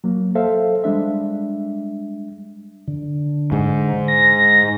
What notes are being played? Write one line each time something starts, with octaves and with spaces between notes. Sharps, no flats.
F#3 A#3
A4 C5 E5 F5
G3 G#3 D4 E5
D3
G#2
A#6